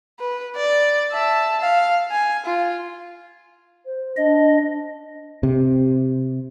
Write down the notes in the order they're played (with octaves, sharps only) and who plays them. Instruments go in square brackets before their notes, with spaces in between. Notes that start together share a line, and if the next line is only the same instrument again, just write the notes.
[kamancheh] B4
D5
E5 A5
F5
G#5
F4
[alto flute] C5
[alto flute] D4 [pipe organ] D#5
[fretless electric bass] C3